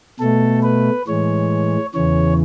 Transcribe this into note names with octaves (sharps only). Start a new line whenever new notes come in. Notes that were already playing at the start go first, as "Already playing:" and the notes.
B2 A3 A4
B4
A2 E3 G#3 C#5
E2 C#3 E3 C#5